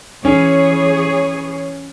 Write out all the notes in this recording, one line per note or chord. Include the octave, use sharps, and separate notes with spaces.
E3 C#4 G#4 C#5